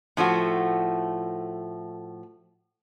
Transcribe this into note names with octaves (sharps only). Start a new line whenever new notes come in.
A2 F3 A3 F#4